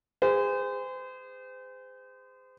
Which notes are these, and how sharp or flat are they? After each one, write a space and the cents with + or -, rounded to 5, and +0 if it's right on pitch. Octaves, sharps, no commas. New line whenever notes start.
G#4 -30 C5 -35